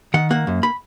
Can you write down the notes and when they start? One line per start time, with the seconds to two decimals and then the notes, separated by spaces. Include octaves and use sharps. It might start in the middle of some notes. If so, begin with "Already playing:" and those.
0.14 D#3 F#5
0.30 A#3 F#5
0.47 F#2
0.63 B5